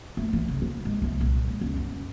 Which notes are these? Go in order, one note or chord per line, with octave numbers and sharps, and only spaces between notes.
A3
E3
C#3
G3
G#3
C2
A#2
G#3
C#2
F#2